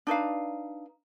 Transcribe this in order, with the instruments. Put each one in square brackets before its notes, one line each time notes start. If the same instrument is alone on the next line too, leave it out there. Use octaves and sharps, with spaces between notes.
[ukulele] D4 D#4 B4 F5